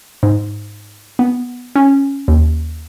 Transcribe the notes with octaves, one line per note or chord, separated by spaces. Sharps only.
G#2
B3
C#4
D#2